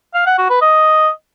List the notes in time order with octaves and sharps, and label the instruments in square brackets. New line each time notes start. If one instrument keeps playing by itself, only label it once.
[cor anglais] F5
F#5
F#4
B4
D#5